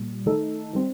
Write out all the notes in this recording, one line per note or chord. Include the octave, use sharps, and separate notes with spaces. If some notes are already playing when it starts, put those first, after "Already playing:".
Already playing: A#2 G3
D#3 A3 D#4 A4
D#3 G3 C4